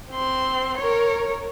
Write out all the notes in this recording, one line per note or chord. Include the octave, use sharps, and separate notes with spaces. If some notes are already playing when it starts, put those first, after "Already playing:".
C4 C6
A#4 C#5